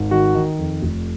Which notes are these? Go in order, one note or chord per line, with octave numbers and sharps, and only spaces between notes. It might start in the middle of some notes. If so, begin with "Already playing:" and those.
Already playing: G#1
D#3 F#4
D#3
F2
F1